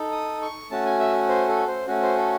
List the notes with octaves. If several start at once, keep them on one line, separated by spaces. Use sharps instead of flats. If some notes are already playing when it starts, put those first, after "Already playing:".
Already playing: D#4 A4
D#6
C#6
A3 C#4 F#4 A5
G#5
E5
C5
A4
C5
A3 C#4 F#4
C5
A4